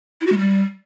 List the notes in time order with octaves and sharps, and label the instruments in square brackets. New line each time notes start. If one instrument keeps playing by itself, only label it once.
[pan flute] E4
F#4
G#3
G3